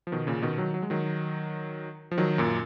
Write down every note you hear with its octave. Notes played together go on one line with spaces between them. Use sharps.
F3
B2 D#3
A#2 C#3
B2 D#3
D#3 F#3
F#3
G#3
D#3 F#3
F3
D#3 F#3
F#2 A#2